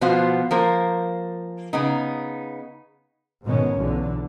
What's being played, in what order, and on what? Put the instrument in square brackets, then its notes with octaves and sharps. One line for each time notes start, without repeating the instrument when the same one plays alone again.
[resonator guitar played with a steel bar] B2 F3 B3 F4 F#4 C5
F3 A#3 A#4 C5
C#3 B3 D#4
[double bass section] G#2 B2 D#3 C#4
B1 E2 D3